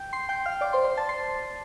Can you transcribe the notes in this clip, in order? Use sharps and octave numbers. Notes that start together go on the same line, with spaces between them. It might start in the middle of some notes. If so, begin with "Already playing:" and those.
Already playing: G5 G6
C6 C7
G5 G6
F5 F6
D5 D6
C5 C6
C5 C6
A5 A6
C6 C7